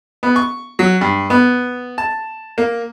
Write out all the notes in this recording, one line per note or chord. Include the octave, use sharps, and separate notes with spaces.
B3
C#6
F#3
G2
B3
A5
A#3